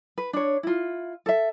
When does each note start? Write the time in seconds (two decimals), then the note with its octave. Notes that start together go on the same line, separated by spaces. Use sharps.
0.18 B4
0.33 D4 C#5
0.63 E4 F4
1.26 A4 E5